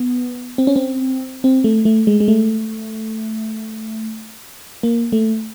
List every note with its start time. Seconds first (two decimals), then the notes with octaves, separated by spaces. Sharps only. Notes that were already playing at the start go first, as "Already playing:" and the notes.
Already playing: B3
0.58 C4
0.67 C#4
0.76 C4
1.44 C4
1.64 A3
1.85 A3
2.07 G#3
2.20 G#3
2.28 A3
4.83 A#3
5.12 A3